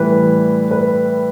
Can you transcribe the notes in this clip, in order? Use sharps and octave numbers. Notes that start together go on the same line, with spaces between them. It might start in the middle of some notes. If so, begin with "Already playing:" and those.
Already playing: A2 E3 G3 B4
B4